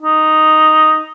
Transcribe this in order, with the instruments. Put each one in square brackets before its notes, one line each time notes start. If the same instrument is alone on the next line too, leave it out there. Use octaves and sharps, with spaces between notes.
[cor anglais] D#4